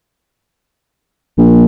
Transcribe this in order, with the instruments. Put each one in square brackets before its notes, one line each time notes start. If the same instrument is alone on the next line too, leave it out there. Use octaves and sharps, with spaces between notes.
[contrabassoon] A#1